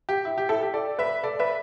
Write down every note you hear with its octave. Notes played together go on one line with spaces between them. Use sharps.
G4
E4
G4
E4 A4
G4
A4 D5
B4 E5
A4 D5
B4 E5